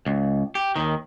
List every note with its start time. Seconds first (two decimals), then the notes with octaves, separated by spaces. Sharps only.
0.06 C#2
0.55 G4
0.76 D#2 D#3